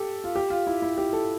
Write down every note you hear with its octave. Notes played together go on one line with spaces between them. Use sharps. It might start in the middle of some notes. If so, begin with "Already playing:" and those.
Already playing: G4 A4
F4
G4
F4
E4
E4
G4
A4